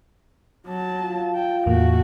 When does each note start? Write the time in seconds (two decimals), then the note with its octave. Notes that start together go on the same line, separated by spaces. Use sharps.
0.67 F#3 A5
1.02 F4
1.35 G5
1.66 E2 A2 A3 A#3 F#4